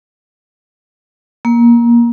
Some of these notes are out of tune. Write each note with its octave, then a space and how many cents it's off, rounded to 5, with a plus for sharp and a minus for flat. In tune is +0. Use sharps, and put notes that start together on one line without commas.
A#3 +20